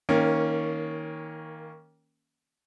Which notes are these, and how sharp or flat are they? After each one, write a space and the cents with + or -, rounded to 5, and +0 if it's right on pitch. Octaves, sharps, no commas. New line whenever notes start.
D#3 +25 A#3 +0 C#4 +0